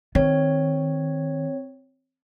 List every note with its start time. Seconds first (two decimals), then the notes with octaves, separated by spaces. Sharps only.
0.15 D#3 C4 C#5